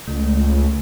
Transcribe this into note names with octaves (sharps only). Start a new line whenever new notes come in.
C#2 A3